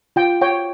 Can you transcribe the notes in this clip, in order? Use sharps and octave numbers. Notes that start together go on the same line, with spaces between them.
F4 G5
C#5 G5